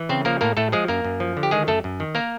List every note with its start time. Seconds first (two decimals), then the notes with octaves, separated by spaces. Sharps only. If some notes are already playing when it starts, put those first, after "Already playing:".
Already playing: E3
0.09 C#3 C4 C5
0.25 F3 A#3 A#4
0.41 A2 A#3 A#4
0.57 A2 A3 A4
0.72 F3 G#3 G#4
0.88 F#2 A#3 A#4
1.04 F#2
1.20 F3
1.37 D3
1.43 G4
1.51 D#3 G#3 G#4
1.67 F#2 A3 A4
1.84 F#2
2.00 D#3
2.15 A#3 A#4